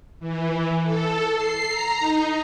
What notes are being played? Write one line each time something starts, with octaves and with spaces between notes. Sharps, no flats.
E3
A4
C7
A#5
D#4